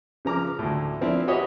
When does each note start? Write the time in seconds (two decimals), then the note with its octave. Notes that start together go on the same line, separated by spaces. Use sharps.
0.25 C#3 F3 A#5 D6 F6
0.59 D2 A2
1.01 F3 C4 D4 E4
1.27 F#4 G4 B4 C#5 D#5 E5